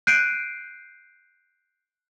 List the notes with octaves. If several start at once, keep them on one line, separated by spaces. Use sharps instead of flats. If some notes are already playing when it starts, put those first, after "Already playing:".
F#6 G6 C7 D7 D#7